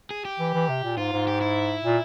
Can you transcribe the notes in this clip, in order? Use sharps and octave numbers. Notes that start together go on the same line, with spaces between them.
G#4
G4
E3
E3
C3
A#2
G#2 F4
G#2
G4
E4
A#2